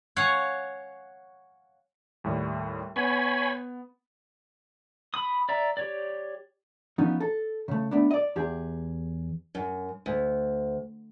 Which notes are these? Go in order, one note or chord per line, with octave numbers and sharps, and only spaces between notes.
C#5 F5 F#5 G#5
D#2 A2 G3
B3 C#5 G#5 B5
B5 D#6
D5 E5 A#5
G4 C#5 D5
F3 B3 C#4 D#4
A4
C#3 A3
A3 B3 D4
D5 D#5
E2 G4 G#4
F#2
D2